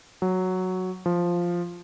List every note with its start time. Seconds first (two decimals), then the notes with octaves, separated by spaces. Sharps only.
0.22 F#3
1.06 F3